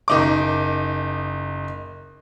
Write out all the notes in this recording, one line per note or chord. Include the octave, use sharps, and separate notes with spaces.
F#1 D#4 D6